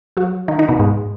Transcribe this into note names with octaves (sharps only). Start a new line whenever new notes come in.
F#3 F#4
D#3 D#4
D#3 D#4
B2 B3
G#2 G#3